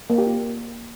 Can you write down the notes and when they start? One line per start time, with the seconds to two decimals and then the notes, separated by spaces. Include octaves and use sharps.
0.10 A#3
0.18 G4
0.27 F4